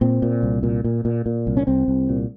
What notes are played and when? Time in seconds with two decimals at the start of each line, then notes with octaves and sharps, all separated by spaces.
0.01 A#2 C4
0.22 A#2
0.43 C2
0.63 A#2
0.84 A#2
1.05 A#2
1.26 A#2
1.47 C2
1.57 C#4
1.67 C2 C4
1.88 C2
2.09 A#2